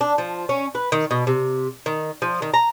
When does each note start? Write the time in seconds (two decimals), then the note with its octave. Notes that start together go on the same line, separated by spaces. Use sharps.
0.01 D4
0.18 F3
0.49 C#4
0.75 B4
0.92 D#3
1.11 B2
1.27 C3
1.86 D#3
2.22 F3
2.42 D#3
2.54 A#5